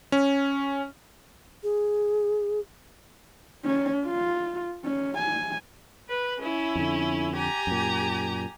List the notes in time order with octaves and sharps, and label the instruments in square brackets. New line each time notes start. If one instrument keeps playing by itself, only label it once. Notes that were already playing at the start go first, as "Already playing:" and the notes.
[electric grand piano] C#4
[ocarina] G#4
[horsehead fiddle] C#4
F4
C#4
G#5
[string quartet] B4
C#4 E4
[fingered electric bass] F2 D3
[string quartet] G4 G#5 A#5
[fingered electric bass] F#2 A#2